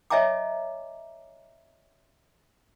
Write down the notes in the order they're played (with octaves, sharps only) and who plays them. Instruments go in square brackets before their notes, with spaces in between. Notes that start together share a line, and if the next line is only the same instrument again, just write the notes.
[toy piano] C#5 D#5 E5 G#5 A#5 D6